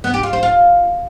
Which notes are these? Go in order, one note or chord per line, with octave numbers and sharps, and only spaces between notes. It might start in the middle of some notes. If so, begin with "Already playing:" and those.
B3
G4
F4
C5
F4